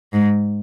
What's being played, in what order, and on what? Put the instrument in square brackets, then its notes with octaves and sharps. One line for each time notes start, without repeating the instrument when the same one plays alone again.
[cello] G#2